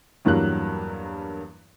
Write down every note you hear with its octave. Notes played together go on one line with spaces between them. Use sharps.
E2 G2 F#3 A#3 G4 F#6